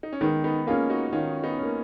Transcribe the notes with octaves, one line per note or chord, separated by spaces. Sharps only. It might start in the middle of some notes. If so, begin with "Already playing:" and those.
D#4
C#4
D#3 G#3 B3
B3 D#4
A#3 C#4 F4 G#4
D#4 F#4
D#3 C#4 F4
B3 D#4
A#3 C#4